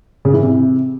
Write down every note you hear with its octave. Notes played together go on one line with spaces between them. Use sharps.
C#3
E3
C3